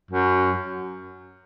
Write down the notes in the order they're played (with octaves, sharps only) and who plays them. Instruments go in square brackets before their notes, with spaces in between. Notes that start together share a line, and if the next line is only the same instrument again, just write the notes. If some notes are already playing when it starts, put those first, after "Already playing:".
[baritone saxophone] F#2